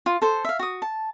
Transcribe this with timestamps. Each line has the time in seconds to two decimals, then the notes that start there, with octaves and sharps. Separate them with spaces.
0.06 F4
0.22 A4 C5
0.45 E5 F5
0.59 F#4 D#6
0.82 A5